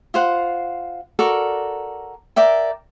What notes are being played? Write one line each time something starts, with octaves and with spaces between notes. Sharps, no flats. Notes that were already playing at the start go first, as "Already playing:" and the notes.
F4 C5 F#5
F#4 A4 A#4 D5
A#4 D5 E5 G5